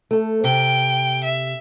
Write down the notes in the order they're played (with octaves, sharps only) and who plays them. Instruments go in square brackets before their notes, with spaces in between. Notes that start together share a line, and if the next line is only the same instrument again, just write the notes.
[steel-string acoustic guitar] A3 A4
[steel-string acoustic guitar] C3 [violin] G5
[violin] E5